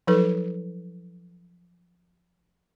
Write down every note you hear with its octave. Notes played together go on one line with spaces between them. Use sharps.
F3 F#3 D#4 A4 B4